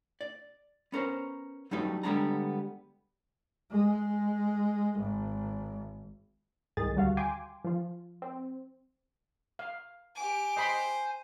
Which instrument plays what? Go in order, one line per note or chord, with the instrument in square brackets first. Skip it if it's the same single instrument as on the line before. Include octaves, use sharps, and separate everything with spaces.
[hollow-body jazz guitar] D5
B3 C#4 A#4 C5
F#3 G3 A3 C#4 D#4 B4
D3 G3 G#3 B3 D4 A#5
[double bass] G#3
G#1
[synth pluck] C2 G#2 D#3 G#4 A6
D2 G3 F#4 F5
G5 G#5 C6 D6
F3 F4
C4
[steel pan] F5
[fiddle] G4 D6 [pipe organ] G#5
[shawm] C5 [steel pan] D#5 B5 C6